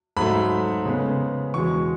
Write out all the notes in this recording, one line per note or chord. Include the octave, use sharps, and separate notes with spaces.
G#2 F#3 A3 B5
C#3 G#3 B3
E2 B2 G#3 C#6